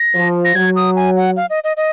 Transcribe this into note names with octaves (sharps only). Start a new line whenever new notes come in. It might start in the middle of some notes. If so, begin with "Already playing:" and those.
Already playing: A#6
F3
A#6
F#3 G#6
D#6
G#5
F#5
F5
D#5
D#5
D#5